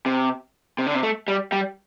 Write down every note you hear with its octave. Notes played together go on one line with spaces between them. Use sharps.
C3
C3
D3
C3
A3
G3
G3